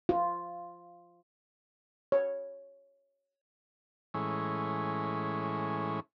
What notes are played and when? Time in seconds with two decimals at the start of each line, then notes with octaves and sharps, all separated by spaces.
0.09 F4
2.12 C#5
4.14 A2 E3 G#3 C#4